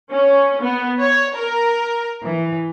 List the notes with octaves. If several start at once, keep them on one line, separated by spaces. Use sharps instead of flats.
C#4
B3
C#5
A#4
E3